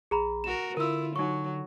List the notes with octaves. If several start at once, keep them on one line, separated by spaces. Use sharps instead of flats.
A#1 G#4 A#5 B5
F#4 A#4 E7
D3 E4 F4 A#4 E6
F#3 D#4 C#6